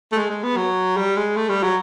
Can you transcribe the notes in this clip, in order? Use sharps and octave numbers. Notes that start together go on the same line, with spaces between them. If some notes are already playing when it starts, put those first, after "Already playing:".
A3
G#3
G#3
B3
F#3
G3
G#3
A3
G3
F#3